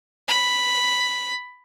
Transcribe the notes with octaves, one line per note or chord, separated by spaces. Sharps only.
B5